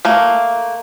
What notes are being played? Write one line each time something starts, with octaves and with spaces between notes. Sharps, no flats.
A3 A#3